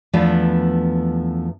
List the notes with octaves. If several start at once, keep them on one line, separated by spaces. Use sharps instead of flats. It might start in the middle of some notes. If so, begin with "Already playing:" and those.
E2 F3 A3 B3 D4